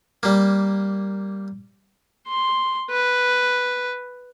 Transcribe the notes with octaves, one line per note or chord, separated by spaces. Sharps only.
G3 A#3
C6
B4